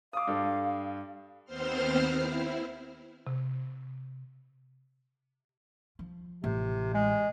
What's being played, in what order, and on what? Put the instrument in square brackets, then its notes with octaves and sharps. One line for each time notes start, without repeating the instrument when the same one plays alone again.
[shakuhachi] F5 [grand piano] D6 D#6
[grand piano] G2 A4
[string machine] D#2 B3 C4 C5 C6 F6
E4
[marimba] C3
[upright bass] F3
[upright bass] A1 [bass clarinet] C3
[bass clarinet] G#3